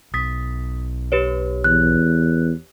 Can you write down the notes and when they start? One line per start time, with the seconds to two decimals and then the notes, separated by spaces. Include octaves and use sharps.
0.14 B1 D#6 A6 B6
1.12 G4 B4 C#5
1.64 E2 F#6